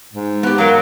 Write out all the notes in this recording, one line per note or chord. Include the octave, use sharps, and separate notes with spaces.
G#2
B3 G4
F#3 A#4 F5 A#5